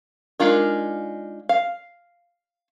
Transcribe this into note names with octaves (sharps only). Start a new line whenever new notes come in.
G#3 D4 D#4 F4 A#4
F5